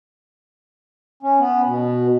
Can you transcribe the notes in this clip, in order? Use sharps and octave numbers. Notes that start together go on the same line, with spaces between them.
C#4
B3
B2